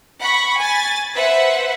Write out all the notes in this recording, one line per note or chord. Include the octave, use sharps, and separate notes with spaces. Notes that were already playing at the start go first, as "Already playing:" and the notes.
F#5 B5 C#6
G#5 A6
B4 C5 E5 F#5